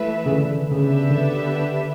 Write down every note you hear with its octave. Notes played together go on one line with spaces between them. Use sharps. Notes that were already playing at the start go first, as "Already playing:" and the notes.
Already playing: E3 A3 E4 B4 E5
C#3
D3
C#3 B3 D4 G4 B4 E5
D3